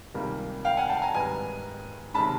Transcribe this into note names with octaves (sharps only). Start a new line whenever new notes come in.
C#2 C3 D#3 G3 A#3
F5 G5
F#5 G#5
G5 A5
G#5 A#5
G#2 D#3 G3 B3 G#5 A#5
C3 D#3 G#3 C#4 A5 B5